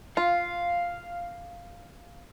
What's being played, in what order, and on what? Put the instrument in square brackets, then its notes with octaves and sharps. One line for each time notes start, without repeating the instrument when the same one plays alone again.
[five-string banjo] F4 [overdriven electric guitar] F5